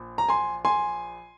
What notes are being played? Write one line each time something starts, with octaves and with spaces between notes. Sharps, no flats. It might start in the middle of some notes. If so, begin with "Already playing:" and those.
Already playing: A#1
A#5
G#5 C6
G#5 C6